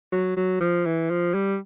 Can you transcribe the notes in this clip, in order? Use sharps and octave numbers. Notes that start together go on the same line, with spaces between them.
F#3
F#3
F3
E3
F3
G3